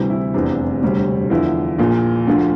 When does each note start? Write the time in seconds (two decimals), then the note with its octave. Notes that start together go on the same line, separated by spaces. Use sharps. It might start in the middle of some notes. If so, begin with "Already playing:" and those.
Already playing: D2 C3 E3 G3
0.10 E4
0.34 F1 E2 C3 D4
0.82 E1 D2 C3 G3
1.30 E2 D3 F3 E4
1.78 A#1 A#2 F3
2.27 D2 D3 F3